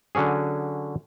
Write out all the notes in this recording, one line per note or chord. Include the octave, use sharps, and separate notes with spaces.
D3 F#3 C#4 G#4